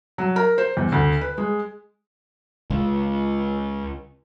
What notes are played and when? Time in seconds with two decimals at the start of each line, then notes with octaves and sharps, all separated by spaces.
0.18 F#3
0.36 A#4
0.58 C5
0.77 E2
0.92 D2
1.21 B4
1.38 G#3
2.70 C#2